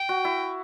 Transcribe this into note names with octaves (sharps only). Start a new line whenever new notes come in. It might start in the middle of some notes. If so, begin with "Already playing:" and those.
Already playing: G5
F#4
E4